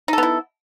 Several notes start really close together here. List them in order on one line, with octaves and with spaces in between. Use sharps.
D#4 A4 B3 E4